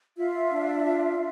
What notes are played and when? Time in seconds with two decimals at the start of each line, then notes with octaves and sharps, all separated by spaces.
0.16 F4 E5
0.51 D4
0.84 F4